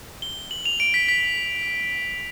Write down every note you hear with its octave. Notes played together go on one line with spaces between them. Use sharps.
G7
F#7
F7
D7
B6
B6